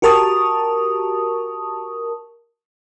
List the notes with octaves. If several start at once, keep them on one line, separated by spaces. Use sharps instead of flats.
F#4 G4 A#4 A5 C#6 D#6